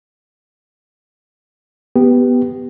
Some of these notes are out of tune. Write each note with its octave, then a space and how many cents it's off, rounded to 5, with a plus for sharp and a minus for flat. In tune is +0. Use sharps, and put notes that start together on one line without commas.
B3 +0 G4 -5